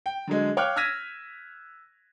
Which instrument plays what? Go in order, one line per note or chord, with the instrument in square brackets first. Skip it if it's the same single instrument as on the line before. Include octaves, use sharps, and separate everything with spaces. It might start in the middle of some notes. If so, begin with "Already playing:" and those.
[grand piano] G5
D3 F#3 G#3
C#5 F5 G5 D6 F6 F#6
E6 F6 G#6 A#6 B6 D#7